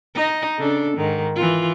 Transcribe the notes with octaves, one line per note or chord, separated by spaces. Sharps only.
D#4 D#5
C#3 D4 A4
G#2 D#3
E3 F4